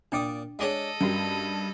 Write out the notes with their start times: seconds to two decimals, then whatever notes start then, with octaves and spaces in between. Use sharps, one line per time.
0.12 A#2 D4 D5 G5 D6 D#6
0.59 G#3 D4 G#4 A4 C#5 D#5 F#5
1.01 G2 C#4 F#4 A#4